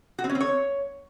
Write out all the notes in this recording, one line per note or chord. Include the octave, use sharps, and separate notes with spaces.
F#4
C4
C#4
C4
C#5